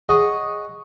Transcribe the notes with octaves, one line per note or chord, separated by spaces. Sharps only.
G#4 C#5 D#5 F#5